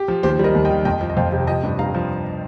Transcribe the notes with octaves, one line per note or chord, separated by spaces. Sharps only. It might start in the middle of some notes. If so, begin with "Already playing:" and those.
Already playing: G4
F3
D#2 G4 C5
G3 A#4 D#5
D#2
D#5 G5
D#3
F2 D#5 G5
F3
D#5
F2 C5 F5
C3
F3 D#5 G5
G2
G2 F5 A#5
F3